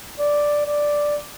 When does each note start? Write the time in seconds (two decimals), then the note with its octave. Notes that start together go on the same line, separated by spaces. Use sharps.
0.19 D5
0.66 D5